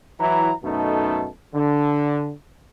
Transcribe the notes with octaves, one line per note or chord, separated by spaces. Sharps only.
E3 F#3 E4 A#5
F#2 B2 A3 D#4 A4
D3